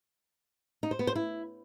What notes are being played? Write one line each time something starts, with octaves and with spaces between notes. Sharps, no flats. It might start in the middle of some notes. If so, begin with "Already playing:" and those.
D#4
C5
B3
C5
E4